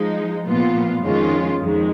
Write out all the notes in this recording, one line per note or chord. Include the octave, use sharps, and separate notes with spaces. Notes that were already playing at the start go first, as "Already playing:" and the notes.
Already playing: F3 G#3 D#4
A#2 F3 B3 F4
F2 D#3 G#3 C#4 F4
F2 D#3 G#3